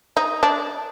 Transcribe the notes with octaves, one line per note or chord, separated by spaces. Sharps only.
D#4
D4